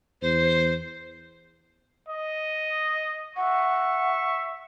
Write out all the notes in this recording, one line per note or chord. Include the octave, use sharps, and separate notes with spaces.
E2 C5
D#5
E5 F#5 C#6